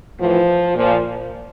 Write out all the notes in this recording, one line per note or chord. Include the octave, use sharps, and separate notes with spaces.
A2 E3 F3
A#2 F3